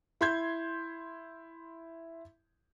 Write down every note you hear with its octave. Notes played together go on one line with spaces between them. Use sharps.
E4 C6 G6 G#6